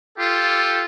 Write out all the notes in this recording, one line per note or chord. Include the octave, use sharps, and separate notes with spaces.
F4 G4 A4